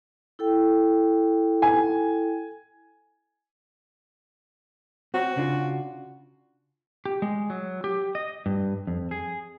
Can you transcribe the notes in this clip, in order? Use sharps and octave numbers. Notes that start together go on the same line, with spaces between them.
E4 A4 G5
G#5
C4 F#4
C#3 D4 F4
G4
G#3
F#3
G4
D#5
G2
F2
G#4